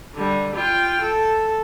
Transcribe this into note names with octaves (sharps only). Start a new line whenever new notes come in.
D3 G3
F4 G5
A4